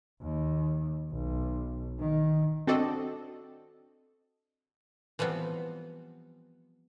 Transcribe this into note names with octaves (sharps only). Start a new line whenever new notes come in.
D#2
B1
D#3
C4 D4 F#4 A4 D5 D#5
E3 F3 G3 B3 C4